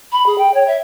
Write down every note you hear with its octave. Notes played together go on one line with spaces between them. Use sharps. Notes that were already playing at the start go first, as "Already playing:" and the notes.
B5
G#4
G5
C#5
E5